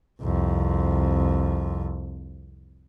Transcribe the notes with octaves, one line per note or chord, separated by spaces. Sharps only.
C2 F2